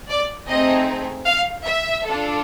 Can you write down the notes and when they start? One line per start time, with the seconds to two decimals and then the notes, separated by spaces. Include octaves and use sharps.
0.09 D5
0.48 A3 C4 D#4 G#4 D#5
1.26 F5
1.65 E5
2.05 D4 F4 A4